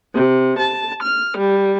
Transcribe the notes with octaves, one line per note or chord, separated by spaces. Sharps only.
C3
A5
F6
G3